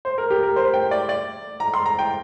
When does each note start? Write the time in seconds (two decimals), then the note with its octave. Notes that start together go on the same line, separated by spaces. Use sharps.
0.05 C5
0.18 A#4
0.30 G4
0.43 A#4
0.56 C5
0.74 G5
0.91 D5
1.09 D5
1.60 A#5
1.74 C6
1.86 A#5
1.99 G5